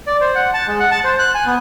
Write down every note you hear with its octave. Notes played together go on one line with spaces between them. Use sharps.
D5
C5
F#5
A5
G#3
F#5
A5
C5
F#6
G#5
B3